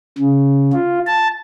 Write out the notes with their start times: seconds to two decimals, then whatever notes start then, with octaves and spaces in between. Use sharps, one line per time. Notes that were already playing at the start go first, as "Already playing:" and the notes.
0.18 C#3
0.73 F4
1.07 A5